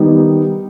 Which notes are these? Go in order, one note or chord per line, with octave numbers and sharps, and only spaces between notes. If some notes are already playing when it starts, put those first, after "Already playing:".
Already playing: D#3 G3 B3 D#4 G4